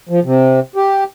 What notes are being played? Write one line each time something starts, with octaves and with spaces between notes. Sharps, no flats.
F3
C3
G4